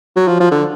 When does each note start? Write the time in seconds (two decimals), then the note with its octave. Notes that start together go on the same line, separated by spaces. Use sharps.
0.16 F#3
0.28 F3
0.40 F3
0.52 D3